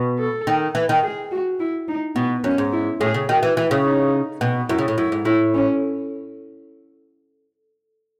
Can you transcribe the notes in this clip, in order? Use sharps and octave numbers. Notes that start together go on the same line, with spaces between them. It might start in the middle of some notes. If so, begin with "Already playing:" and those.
Already playing: B2
A4
D#3
E3
D#3
G#4
F#4
E4
D#4
B2 B3
F#2 C#4
G#2
E4
A2 G#4
C#3
D#3 F#4
E3
E3 E4
C#3
D#4
B2
F#2 E4
C#3
A2
F#2 E4
G#2
A2 E4
C#4